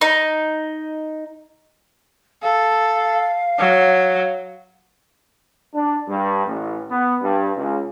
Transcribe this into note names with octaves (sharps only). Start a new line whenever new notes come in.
D#4
A4 F5
F#3
D4
G2
A1
B3
G2
C#2